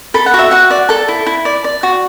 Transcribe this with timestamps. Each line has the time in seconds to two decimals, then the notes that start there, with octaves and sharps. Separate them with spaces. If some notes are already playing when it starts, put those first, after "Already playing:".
0.14 A4 B5
0.26 F#5
0.34 F#4
0.39 E5
0.51 F#4 F#5
0.70 D5
0.89 A4 A5
1.08 E4
1.26 E4
1.45 D5
1.64 D5
1.83 F#4